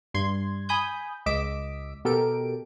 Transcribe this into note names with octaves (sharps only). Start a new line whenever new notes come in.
G2 C6 G#6
G#5 B5 D#6 G6
C#2 D#5 D6 E6 B6 D7
B2 G4 A4 A#4 D7